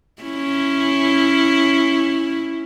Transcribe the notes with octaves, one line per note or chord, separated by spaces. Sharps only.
C#4 E4